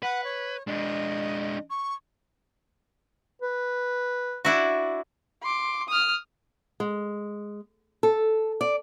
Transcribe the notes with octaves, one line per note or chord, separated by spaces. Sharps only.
B4 F#5
C#5
G#3 D4 D#5
C#6
B4
D4 E4 F#4
C6 D6
D#6 F6
G#3
A4
D5